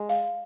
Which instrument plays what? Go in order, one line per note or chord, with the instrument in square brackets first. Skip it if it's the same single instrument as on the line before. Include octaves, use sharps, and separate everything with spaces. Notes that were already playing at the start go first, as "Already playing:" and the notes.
Already playing: [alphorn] G#3
[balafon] F5